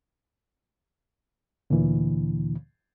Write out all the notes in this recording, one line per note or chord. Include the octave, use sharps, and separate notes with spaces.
D2 A#2 D3 E3